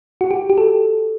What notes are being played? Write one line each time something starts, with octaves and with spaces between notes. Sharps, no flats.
F#4
G4
G4
A4